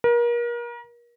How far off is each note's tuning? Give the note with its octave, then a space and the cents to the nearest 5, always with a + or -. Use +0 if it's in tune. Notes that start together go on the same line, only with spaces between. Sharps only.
A#4 +35